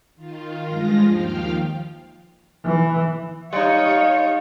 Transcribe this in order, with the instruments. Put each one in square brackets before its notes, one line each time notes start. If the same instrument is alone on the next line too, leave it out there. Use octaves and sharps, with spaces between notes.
[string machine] D#3 F4
G2 F3 G#3 F4 A#6
D#2 F3 F5 G5 F6
[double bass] E3
[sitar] G3 D#4 [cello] C#5 D#5 [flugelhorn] F5